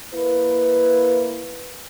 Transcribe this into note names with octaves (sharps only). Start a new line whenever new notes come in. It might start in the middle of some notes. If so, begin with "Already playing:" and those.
A#3 E4 B4